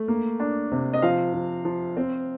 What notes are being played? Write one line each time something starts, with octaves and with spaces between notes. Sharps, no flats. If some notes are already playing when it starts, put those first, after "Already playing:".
Already playing: A3
A#3
D4
C3
D#5
F3 F5
F3
F3
C4